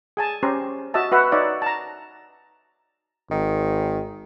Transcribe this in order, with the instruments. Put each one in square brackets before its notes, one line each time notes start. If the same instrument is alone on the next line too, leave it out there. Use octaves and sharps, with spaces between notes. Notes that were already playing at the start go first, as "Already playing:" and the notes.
[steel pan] G#4 G#5 A5
C#4 G4 C5 A#5
F#4 D#5 E5 A5
F#4 B4 E5 F#5
D#4 C#5 D5 E5 F#5
A5 A#5
[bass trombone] G#1 [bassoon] D#3